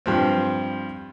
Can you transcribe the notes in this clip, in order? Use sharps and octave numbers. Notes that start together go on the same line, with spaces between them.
G2 F3 C4